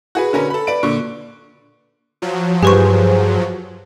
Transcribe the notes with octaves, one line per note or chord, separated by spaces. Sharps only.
F#4 G#4 B4
D3 C#4 A#4 B4
A4 B5
B4 D5 D7
A#2 D3 C#6
F3 F#3
G2 G4 G#4 B4 C5 C#6